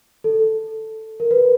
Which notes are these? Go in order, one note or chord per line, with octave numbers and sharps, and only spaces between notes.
A4
A#4
B4